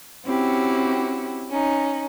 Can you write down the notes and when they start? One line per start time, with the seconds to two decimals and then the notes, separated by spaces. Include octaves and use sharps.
0.25 C4 C#4 E4 F#4 G4
1.49 C#4 D#4